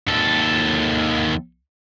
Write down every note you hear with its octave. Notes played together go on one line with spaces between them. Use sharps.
D#2 A4